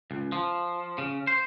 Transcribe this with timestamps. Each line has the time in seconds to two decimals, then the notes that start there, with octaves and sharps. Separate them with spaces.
0.11 C#2
0.32 F3
0.98 C#3
1.27 C5